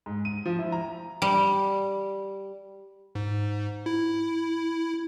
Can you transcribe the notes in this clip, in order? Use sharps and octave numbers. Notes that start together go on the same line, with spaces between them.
G#2
D#7
F3
E4
A#5
G3
G#2
E4